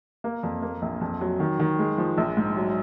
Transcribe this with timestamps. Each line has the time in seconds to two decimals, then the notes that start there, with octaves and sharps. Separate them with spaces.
0.24 A#3
0.43 F2
0.62 A#3
0.82 A#1
1.01 F2
1.21 F#3
1.40 D#3
1.60 D#3
1.79 G#3
1.98 F3
2.18 A#1
2.37 G#2
2.57 F#3